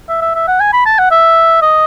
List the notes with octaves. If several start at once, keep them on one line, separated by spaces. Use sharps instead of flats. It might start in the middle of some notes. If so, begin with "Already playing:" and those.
E5
E5
E5
F#5
G#5
B5
A5
F#5
E5
D#5